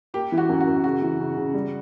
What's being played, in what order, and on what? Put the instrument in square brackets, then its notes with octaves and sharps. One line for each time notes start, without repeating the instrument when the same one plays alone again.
[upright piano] A#3 [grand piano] G4
[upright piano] E3
[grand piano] F#4
[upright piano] F#2
[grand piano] F#4
[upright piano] F#2
[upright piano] C#3 [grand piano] F#4
[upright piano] E3
C#3
C#3
G3